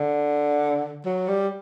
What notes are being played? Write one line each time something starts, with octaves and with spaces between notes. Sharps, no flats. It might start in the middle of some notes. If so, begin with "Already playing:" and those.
Already playing: D3
F#3
G3